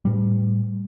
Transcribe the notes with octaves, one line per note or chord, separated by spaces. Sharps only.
A2 G3